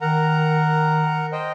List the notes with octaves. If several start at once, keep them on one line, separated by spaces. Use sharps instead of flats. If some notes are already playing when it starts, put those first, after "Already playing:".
D#3 A#4 F#5 A#5
C5 D#5 G5